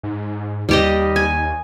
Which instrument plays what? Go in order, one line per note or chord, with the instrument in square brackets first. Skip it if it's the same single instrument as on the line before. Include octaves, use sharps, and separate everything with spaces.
[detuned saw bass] G#2
[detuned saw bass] D#2 [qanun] G3 G4 D#5
[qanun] G#5